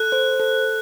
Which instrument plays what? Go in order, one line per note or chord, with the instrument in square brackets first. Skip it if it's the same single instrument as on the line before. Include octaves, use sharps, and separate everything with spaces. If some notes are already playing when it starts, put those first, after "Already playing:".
Already playing: [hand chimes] A4 [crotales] F#6
[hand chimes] C5
A4